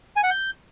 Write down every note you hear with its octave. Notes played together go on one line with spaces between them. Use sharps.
G#5
F#5
G6